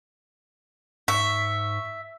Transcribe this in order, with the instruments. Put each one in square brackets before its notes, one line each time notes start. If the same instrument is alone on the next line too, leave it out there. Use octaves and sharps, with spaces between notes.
[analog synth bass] G#2 [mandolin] E5 [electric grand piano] C#6 B6